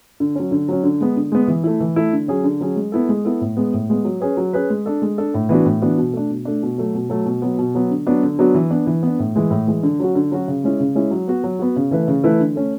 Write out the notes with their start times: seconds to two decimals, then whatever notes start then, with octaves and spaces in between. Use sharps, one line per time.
0.20 D3
0.36 F#3 C#4
0.51 D3
0.69 F#3 C#4
0.83 D3
1.01 G#3 B3
1.17 D3
1.32 G#3 B3
1.48 E3
1.64 A3 E4
1.80 E3
1.96 A3 E4
2.13 D3
2.28 F#3 C#4 G#4
2.44 D3
2.61 F#3 C#4 G#4
2.76 G#3
2.92 B3 E4 A4
3.09 G#3
3.25 B3 E4 A4
3.41 A2
3.57 G#3 B3
3.73 A2
3.90 G#3 B3
4.05 F#3
4.21 C#4 G#4 B4
4.37 F#3
4.53 C#4 G#4 B4
4.70 G#3
4.86 D4 A4
5.02 G#3
5.18 D4 A4
5.34 A2
5.49 E3 B3 D4 F#4
5.65 A2
5.82 E3 B3 D4 F#4
5.98 B2
6.14 A3 D4
6.30 B2
6.45 A3 D4
6.63 B2
6.78 F#3 A3
6.94 B2
7.10 F#3 A3
7.26 B2
7.42 F#3 B3
7.58 B2
7.75 F#3 B3
7.91 D3
8.06 F#3 B3 D4 F#4
8.23 D3
8.39 F#3 B3 D4 F#4
8.54 E3
8.71 B3 D4
8.87 E3
9.03 B3 D4
9.19 A2
9.36 E3 G#3
9.51 A2
9.67 E3 G#3
9.83 D3
10.00 F#3 C#4 F#4
10.15 D3
10.31 F#3 C#4 F#4
10.48 C#3
10.64 G#3 C#4 E4
10.80 C#3
10.95 G#3 C#4 E4
11.11 F#3
11.28 B3 F#4
11.44 F#3
11.59 B3 F#4
11.76 C#3
11.91 E3 A3 E4 B4
12.08 C#3
12.24 E3 A3 E4 B4
12.41 D3
12.56 A3 C#4